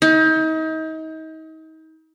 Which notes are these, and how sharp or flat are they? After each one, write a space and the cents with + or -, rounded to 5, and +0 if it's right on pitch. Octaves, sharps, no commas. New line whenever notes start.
D#4 +35